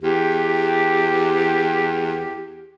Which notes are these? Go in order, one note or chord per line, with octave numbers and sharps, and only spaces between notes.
E2 G4